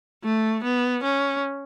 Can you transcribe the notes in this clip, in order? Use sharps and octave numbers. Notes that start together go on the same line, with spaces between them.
A3
B3
C#4